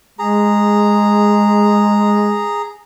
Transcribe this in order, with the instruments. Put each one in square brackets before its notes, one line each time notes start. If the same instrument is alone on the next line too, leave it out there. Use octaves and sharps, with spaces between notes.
[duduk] G#3 [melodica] G#4 A#5